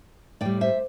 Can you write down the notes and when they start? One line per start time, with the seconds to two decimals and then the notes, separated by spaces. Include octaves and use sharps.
0.41 A2 G3 D5 G5
0.61 C5 E5